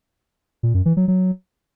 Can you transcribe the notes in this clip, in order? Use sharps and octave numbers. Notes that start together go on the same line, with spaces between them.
A#2
F#2
E3
F#3
F#3